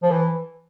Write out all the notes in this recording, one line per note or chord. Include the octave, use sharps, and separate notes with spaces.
F3
E3